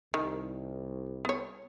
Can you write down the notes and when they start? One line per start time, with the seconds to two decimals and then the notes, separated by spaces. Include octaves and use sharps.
0.14 C2 D#3
1.25 B3 C#5